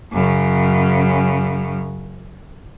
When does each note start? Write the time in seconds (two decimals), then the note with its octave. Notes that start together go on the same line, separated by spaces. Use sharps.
0.12 F#2 C#3